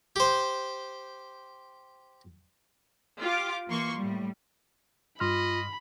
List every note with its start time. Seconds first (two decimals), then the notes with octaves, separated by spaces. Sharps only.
0.16 G4 C5
3.22 F4 G4 D6
3.69 E3 A#3 C6 C#6
3.98 A2 G3
5.20 G2 F4 D#5 B5 C6 F6